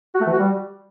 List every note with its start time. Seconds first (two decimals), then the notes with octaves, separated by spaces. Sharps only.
0.15 F#4
0.21 A3
0.27 E3
0.33 F#4
0.39 G3